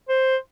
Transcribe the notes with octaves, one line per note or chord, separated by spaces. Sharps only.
C5